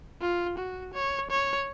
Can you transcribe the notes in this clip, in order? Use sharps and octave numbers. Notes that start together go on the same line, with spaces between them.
F4
F#4
C#5
C#5